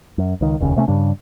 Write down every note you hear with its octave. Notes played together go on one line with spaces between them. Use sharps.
F#2
C#2 D#3
F1 D#2 C#3
C3 A3 A#3 C#4
G2 C#3 G3 D4